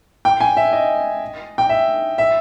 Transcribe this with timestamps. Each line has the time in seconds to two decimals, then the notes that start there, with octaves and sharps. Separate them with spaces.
0.25 G5
0.40 G#5
0.57 E5
0.73 D#5
1.58 G5
1.69 E5
2.18 E5